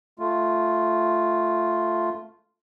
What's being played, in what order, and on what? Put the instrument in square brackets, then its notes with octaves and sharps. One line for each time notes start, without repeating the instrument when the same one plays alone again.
[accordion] A3 F4